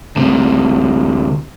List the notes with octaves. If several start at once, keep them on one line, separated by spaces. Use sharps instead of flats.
D2 C3